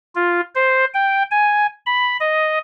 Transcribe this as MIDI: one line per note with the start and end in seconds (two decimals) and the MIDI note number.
0.15 0.41 65
0.55 0.85 72
0.94 1.23 79
1.31 1.67 80
1.86 2.17 83
2.20 2.58 75